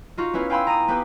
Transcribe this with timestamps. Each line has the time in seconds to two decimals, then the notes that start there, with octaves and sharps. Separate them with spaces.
0.17 D#4 F4 F#4
0.33 B3 C#4 E4 B4 F5
0.50 F5 G5 G#5 B5 C6 E6
0.67 A#5 D#6 D#7
0.88 B3 C4 G4 B4